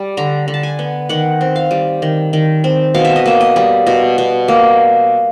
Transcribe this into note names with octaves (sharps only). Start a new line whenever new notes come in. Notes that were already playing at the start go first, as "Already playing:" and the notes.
Already playing: G3
D3 A#5
D3
A5
G#5
B3
D#3 F#5
C4
F5
G3
D#3
D#3
C4
B2 F5
E5
D#5
A#3 E5
D#5
G3
B2
B2
A#3